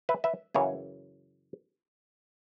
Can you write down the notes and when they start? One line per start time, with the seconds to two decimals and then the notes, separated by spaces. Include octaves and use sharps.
0.09 B4 E5
0.24 B4 E5
0.55 F#2 C#3 E3 G#4 C#5